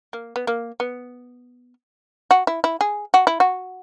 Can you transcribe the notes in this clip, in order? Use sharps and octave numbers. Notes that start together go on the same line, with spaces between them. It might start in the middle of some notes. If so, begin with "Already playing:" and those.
A#3
B3
A#3
B3
F#4
E4
E4
G#4
F#4
E4
F#4